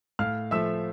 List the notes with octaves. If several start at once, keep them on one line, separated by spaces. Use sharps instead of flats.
A2 F5 F6
F3 A3 E5 E6